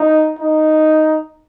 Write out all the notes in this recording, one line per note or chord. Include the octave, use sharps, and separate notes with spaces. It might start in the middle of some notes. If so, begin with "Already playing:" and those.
Already playing: D#4
D#4